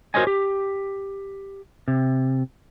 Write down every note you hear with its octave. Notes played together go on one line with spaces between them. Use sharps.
F#4 A#4 C5 C#5 D#5 G#5
G4
C3